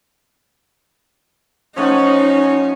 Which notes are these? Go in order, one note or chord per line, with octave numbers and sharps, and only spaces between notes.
F3 A3 C#4 D#4 F#5